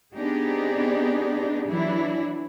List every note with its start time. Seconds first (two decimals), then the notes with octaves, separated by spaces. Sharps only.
0.16 B3 C4 D4 D#4 G4 G#4
1.68 E3 F#3 D4 E4